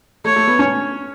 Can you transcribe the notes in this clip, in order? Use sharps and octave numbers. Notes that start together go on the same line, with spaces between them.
A3 C#5
A3
B3
C#4